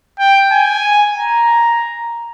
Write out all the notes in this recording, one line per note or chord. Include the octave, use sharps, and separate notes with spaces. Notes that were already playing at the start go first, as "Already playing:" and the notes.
G5
G#5
A#5